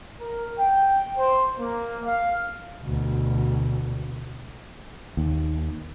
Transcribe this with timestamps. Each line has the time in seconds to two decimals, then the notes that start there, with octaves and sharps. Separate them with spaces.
0.21 A#4
0.59 G5
1.17 C5
1.60 A#3
2.05 F5
2.82 D2 B2
5.17 D#2